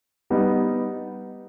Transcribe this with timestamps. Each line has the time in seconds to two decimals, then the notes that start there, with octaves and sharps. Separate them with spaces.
0.30 G3 B3 D#4